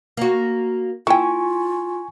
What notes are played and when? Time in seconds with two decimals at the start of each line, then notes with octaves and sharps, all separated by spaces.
0.17 A#3 F#4
1.07 A#3 E4 F4 G5 G#5 C#6